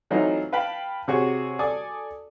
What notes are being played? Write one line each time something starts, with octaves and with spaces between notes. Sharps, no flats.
E3 F#3 A3 C4 D#4 F4
B4 F5 G5 A5 B5
C3 C4 F#4 G#4 C#5 C#6
A4 D5 G#5 D6 D#6